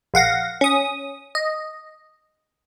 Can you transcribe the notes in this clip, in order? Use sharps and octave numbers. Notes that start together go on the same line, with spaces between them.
A#1 F5 F#5 A#6
C#4 D#6
D#5